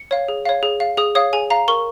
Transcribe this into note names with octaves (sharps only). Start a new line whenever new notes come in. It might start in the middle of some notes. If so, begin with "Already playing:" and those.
Already playing: C#7
C#5 F5
G#4
C#5 F5
G#4
F5
G#4 D#6
C#5 F5 D#6
G#4 G#5
F5 A#5
A#4 C#6